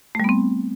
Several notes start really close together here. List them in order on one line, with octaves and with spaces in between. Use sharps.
A3 G3 B3 C4